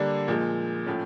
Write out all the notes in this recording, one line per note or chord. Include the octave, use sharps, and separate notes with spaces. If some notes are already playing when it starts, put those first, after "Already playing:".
Already playing: D3 G3 A#3 D4
A#2 F3 G#3
A2 F3 A3 C#4